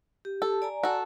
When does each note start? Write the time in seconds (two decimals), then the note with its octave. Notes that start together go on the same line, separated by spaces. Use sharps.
0.25 G4
0.42 A4
0.62 D5 G#5 A#5
0.83 F#4 A4